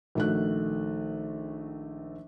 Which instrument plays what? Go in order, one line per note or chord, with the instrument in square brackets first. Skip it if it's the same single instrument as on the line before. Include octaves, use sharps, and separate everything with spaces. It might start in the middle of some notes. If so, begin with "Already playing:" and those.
[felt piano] A#1 D#3 A3 F#4 F#6